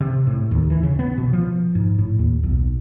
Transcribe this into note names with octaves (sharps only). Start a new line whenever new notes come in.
C3
A2
D#2
E3
C#3
B3
B2
F3
G#2
A2
D#2
B1